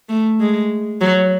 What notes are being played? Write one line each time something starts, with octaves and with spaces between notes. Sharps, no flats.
A3
G#3
F#3